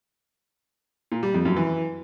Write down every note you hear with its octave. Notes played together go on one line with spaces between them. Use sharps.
A#2
G3
F2
F#2
E3